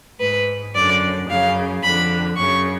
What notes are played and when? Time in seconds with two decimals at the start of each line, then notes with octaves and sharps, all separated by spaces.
0.20 G#2 B4
0.75 F#2 D3 D5
1.28 F#2 C#3 F5
1.82 F2 D3 B5
2.36 F#2 C#3 C#6